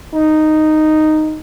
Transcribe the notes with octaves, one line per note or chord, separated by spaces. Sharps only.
D#4